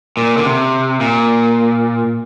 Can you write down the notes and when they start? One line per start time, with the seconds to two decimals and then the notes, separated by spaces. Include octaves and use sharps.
0.17 A#2
0.38 D3
0.45 C3
1.01 A#2